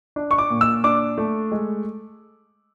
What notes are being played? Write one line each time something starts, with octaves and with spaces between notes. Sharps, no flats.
D4
C#6
D6
A#2
E6
D4 D6
A3
G#3